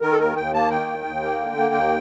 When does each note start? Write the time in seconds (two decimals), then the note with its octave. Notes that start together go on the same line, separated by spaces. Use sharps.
0.01 D#3 A#4
0.12 A4
0.19 D#2 A#4
0.36 D#2 G5
0.54 A#3 A5
0.71 D#3 G5
0.88 D#2
1.05 D#2
1.22 A#3
1.40 D3
1.57 A#3
1.74 D#2